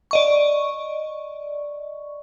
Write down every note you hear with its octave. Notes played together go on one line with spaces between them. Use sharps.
D5 D#5 C#6